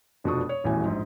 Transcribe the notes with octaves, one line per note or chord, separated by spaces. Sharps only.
F1 B2 F3 D4 C#6 D#6
C#5
D#1 A1 E2 A2 F#4 G#5
A#1 G#2